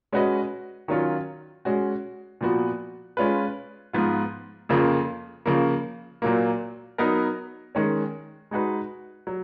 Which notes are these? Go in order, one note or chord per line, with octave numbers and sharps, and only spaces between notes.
G#3 C#4 F#4 B4 D#5
D#3 F#3 C#4 F4
G#3 C#4 F#4
A#2 F3 B3 F#4
G#3 C#4 F4 B4
G#2 F3 B3 F4
F2 C#3 F3 A#3
C#3 F3 A#3
A#2 F#3 A#3
F#3 B3 D#4 A#4
D#3 G#3 C#4
G#3 D#4 F#4 B4
F#3